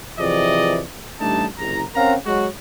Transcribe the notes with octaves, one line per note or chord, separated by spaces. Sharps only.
C3 E3 F3 G#4 D5 D#5
A1 G3 A3 D4 D#4 A5
F#1 C2 A#5
C4 C#4 A#4 F5 F#5 A#5
F#3 G#3 F#4